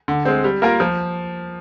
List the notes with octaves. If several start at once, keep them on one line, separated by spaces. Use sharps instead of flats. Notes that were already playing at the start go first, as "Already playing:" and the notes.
D3
G#3 C4
G3
A#3 F4 A#4
F3